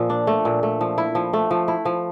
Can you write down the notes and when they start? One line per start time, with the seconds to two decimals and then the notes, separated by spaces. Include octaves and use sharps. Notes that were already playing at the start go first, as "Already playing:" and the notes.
Already playing: A#2 F3
0.10 D4
0.27 A3
0.45 A#2
0.63 A3
0.81 F3
0.98 E4
1.15 F3
1.33 A3
1.51 F3
1.68 E4
1.85 F3